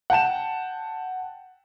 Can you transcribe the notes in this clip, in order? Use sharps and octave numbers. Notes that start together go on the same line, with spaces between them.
F#5 G5 A5 E7